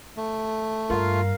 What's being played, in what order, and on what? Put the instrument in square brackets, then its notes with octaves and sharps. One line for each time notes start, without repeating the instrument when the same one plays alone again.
[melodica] A3
[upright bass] G2 [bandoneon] F4 [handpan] A#4 F5